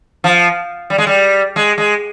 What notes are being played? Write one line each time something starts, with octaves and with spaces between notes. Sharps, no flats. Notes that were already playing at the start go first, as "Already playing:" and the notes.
F3
G3
G#3
G3
G#3
G#3